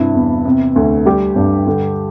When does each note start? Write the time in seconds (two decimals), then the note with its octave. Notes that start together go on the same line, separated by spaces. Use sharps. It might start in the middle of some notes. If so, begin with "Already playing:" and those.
Already playing: G2 C3 E4
0.15 E2
0.45 C3
0.76 D2
1.05 G3 G4
1.36 G2
1.67 D3